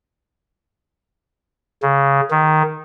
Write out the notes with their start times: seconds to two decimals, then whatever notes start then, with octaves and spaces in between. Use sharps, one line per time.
1.82 C#3
2.31 D#3